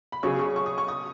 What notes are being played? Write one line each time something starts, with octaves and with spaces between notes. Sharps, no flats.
B5
C#3 F#3 C#4 G#4 C#6
C#6
C#6
D#6
C#6
D#6